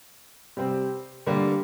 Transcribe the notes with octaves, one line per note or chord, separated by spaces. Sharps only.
C3 G3 C4
D3 G3 A#3